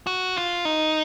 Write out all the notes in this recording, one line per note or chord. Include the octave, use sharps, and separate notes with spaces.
F#4
F4
D#4